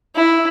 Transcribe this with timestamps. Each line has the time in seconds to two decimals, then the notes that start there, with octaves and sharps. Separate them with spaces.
0.16 E4